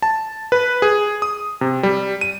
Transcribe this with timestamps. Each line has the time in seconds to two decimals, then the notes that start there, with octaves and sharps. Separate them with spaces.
0.02 A5
0.52 B4
0.82 G#4
1.22 D#6
1.61 C3
1.83 G3
2.21 D#7